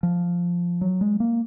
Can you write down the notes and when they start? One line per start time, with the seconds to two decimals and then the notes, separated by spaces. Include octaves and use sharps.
0.03 F3
0.81 F#3
1.01 G#3
1.20 A#3